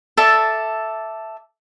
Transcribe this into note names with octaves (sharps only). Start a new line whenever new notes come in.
A4 D5 E5